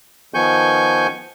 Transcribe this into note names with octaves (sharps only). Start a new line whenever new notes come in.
D#3 F3 B3 G#5 C#6 G6